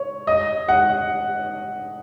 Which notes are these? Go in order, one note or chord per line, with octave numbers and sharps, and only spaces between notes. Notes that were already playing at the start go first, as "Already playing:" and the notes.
Already playing: C#5
D#5
F#5